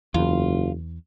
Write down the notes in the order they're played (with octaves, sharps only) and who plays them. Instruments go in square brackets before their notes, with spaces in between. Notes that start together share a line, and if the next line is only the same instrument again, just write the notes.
[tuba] F#1 [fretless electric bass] E2 [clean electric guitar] F4